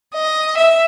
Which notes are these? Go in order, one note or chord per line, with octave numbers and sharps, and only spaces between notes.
D#5
E5